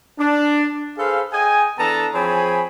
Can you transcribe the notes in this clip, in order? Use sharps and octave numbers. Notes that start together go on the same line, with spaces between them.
D4
G#4 A4 B4 C5 F5
G#4 D#5 G5 G#5
E3 B3 D4 A4 A5 A#5
F3 C4 G#4 C#5 G#5 B5